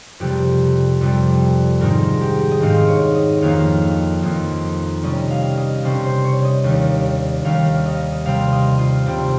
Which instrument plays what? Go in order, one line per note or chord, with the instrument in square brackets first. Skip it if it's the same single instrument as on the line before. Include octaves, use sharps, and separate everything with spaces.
[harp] F2 C3 G3 G4
F2 C3 G3
G#2 D#3 G#3 C4 D#4 A#4
G4
D#5
G#2 D#3 G#3 C4 D#4 F5
C#5
D#5
F2 D#3 A#3 D#4 F5
F2 D#3 A#3 D#4
C3 G3 C#4 D#5
F5
D#5
C3 G3 C#4 C5
C5
C#5
D#5
D#2 D#3 G3
D#2 D#3 G3 F5
D#5
C3 G3 C4 F5
D#5
F4
C3 G3 C4